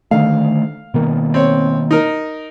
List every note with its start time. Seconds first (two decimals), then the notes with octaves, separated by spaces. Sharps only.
0.11 D3 D#3 A3 F5
0.94 B2 D#3 A#3
1.34 C4 C#5
1.91 D#4 A#4